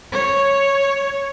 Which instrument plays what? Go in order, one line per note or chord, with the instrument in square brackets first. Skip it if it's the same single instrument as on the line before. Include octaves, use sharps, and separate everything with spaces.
[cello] C#5